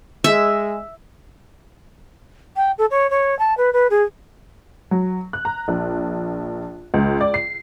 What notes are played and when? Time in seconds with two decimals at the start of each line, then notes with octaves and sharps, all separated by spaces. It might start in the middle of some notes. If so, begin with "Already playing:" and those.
0.24 G#3 E5
2.56 G5
2.78 A4
2.90 C#5
3.10 C#5
3.39 A5
3.57 B4
3.72 B4
3.90 G#4
4.91 F#3
5.33 F#6
5.45 A#5
5.68 A#1
6.94 C#2
7.21 D5
7.34 C7